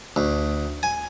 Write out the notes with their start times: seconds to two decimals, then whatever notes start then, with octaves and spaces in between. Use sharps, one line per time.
0.16 D2
0.83 G#5